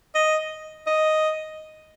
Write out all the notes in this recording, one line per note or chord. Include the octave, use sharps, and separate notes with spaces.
D#5
D#5